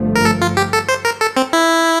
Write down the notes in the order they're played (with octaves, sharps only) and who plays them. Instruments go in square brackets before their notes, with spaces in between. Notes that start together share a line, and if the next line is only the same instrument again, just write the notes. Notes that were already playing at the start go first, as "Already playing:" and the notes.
Already playing: [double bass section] G1 G2 F3 A3
[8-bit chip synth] A#4
A4
F4
G4
A4
C5
A#4
A4
C4
E4